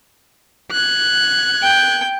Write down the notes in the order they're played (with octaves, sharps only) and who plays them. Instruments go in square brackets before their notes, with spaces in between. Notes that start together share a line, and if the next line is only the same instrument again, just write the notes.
[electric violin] F#6 G#6
[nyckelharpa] G5